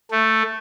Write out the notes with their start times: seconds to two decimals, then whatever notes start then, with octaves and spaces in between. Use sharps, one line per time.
0.11 A3